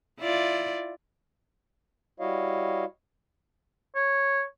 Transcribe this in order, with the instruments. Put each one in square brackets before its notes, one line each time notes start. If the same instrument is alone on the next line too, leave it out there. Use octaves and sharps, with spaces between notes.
[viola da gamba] E4 F4 D5
[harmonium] G3 E4 F#4 C#5 D#5 F5
[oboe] C#5